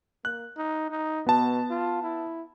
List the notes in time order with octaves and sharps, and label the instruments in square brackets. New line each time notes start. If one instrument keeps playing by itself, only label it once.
[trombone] A#3 [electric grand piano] F#6
[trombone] D#4
D#4
[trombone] B2 [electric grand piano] B3 A5
[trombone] F4
E4